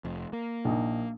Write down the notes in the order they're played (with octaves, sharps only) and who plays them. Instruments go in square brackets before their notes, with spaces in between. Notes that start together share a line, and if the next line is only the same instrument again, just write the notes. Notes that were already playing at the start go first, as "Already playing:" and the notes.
[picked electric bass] F1 F2
A#3
[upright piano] A#1 D#4